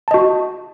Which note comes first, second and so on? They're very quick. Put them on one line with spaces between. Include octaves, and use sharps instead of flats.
A5 D#5 F#4